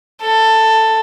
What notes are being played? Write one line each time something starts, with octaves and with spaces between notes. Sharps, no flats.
A4